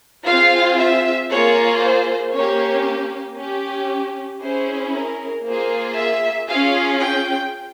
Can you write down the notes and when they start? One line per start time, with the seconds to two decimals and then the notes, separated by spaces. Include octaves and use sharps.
0.27 C4 F4 G#4 F5
0.79 E5
1.31 A#3 F4 G#4 C#5
1.82 C5
2.34 A#3 C#4 G4 C#5
3.39 C#4 G4
4.41 C#4 E4 G#4 C5
4.94 A#4
5.46 A#3 F4 G#4 C5
5.98 E5
6.49 C#4 F4 G#4 F5
7.02 G5